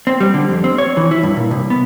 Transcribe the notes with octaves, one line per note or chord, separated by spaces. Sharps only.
C4
G3
D3
F2
C4
C#5
E3
E4
G2
A#2
C2
B3